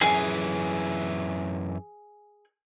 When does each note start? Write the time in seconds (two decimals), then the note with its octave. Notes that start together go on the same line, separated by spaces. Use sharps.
0.01 F#2 E3 G#4